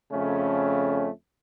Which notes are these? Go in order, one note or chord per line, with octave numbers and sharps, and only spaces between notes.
F2 C#3 A3 C#4